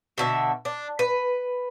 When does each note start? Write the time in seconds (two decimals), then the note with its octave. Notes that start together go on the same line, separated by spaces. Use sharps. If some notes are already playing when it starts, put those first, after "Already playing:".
0.18 B2 D3 E5
0.65 D4
0.99 B4